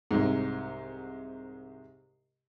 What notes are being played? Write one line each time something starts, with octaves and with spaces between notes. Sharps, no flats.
C2 G#2